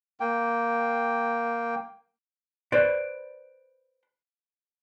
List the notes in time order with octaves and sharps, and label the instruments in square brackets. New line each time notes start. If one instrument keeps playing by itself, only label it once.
[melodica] A#3 G5
[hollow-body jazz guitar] B4 C5 D5